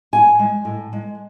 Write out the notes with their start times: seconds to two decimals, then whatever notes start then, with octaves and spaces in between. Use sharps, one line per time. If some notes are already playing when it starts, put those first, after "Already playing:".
0.13 A2 G#5
0.39 G#3
0.65 A2
0.93 G#3